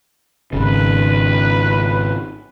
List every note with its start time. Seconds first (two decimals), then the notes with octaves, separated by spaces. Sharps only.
0.53 G#1 C#3 B4